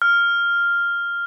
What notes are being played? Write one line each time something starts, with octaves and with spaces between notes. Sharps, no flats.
F6